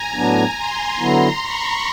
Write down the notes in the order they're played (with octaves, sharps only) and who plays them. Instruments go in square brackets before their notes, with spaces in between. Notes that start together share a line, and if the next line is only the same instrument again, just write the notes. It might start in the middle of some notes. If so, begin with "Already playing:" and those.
Already playing: [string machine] G#5 A#5
[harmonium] A2 F#3 B3 D4
[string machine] A#5 C6
[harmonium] D3 F#3 B3 E4
[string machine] B5 C#6